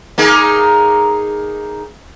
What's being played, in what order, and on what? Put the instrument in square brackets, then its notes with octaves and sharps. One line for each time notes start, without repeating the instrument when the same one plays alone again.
[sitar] A#3 D#4 G#4